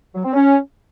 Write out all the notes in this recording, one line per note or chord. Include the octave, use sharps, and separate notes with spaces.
F#3
C4
C#4